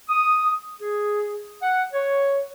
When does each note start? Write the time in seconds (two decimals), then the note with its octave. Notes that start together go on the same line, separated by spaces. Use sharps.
0.09 D#6
0.81 G#4
1.62 F#5
1.93 C#5